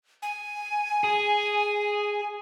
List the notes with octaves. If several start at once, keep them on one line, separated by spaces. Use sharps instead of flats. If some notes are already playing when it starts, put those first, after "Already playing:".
G#5
G#4